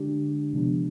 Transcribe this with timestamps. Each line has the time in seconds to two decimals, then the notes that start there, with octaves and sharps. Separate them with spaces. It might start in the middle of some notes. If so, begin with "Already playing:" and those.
Already playing: D3 G#3 D4 G4
0.53 C3 F3 G#3 B3 D4